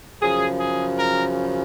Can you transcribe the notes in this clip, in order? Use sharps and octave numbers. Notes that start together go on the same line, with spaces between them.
F#2 C#3 F3 G#4
G#4
A#4